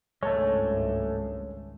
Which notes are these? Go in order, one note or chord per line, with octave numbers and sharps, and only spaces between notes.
G#1 C#2 G2 G#3 A3 C#5 A5